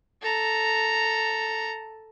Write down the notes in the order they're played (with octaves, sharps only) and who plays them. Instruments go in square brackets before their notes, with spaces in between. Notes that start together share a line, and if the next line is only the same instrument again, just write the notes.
[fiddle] A4 A#5